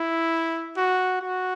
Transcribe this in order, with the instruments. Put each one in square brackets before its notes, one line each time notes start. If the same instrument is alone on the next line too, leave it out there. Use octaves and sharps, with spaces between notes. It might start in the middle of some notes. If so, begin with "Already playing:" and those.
Already playing: [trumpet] E4
F#4
F#4